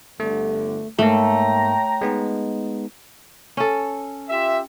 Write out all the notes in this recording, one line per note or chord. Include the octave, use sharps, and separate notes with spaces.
G1 D3 A3
G#2 A3 A#3 C#5 G5 A#5
G#3 B3 D#4
C#4 A4
F4 G4 E5